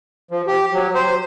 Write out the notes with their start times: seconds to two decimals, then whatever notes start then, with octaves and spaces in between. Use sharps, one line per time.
0.31 F3
0.47 G4
0.73 F#3
0.95 C5